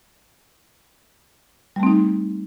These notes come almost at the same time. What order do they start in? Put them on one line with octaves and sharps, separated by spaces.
G3 A3 C4 D#4